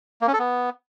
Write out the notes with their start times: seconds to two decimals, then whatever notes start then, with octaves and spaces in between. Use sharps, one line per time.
0.21 A#3
0.27 C#4
0.33 A4
0.39 B3